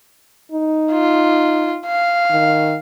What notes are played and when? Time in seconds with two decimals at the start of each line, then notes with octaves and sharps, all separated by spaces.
0.52 D#4
0.92 F4
1.87 F5
2.31 D#3